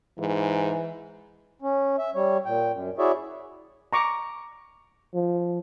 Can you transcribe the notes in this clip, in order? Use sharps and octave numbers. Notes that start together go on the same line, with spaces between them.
G#2 E3
C#4
E5
G3 C#5
A#2 G5
F#2
E4 F#4 G#4 C#5 D5 E5
A#5 C#6 D6
F3